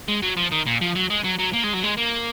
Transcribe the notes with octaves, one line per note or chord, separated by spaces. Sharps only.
G#3
F#3
F3
D#3
A#2
F3
F#3
G#3
F#3
F#3
A#3
G#3
F#3
G#3
A#3